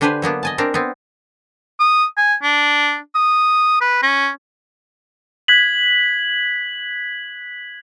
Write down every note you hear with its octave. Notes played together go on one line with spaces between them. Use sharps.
D3 D4 G4 B4 C5 G#5
F#3 A#3 B3 D4
D#5 G#5 A5
C4 D4 A#4
B3 C4
D#6
G#5
D4
D#6
B4
C#4
F#6 G#6 B6 F#7